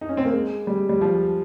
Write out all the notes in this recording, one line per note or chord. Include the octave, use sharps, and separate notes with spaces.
D#4
C#4
C4
A#3
G#3
G3
G3
F3